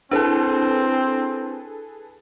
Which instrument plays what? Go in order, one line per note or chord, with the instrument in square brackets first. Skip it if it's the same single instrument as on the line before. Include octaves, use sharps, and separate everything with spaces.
[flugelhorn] C4 [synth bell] D4 E4 [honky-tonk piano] G#4 A4 B4